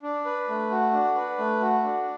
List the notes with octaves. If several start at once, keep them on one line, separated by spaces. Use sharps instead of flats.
D4
B4
A3
F#4
D4
B4
A3
F#4
D4